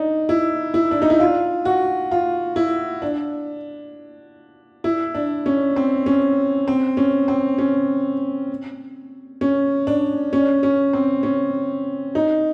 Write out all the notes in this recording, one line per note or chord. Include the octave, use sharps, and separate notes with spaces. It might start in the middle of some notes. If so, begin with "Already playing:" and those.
Already playing: D4 D#4
E4
E4
D4
D#4
E4
F4
F#4
F4
E4
D4
E4
D4
C#4
C4
C#4
C4
C#4
C4
C#4
C#4
D4
C#4
C#4
C4
C#4
D#4